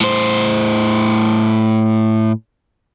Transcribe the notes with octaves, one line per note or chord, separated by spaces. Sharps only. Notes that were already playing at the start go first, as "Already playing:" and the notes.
A2 C5